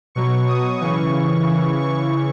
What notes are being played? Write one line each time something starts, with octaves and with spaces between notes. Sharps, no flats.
B2 F#3 C#6
D#6
C#3 E3 C#6
C#3 E3
C#6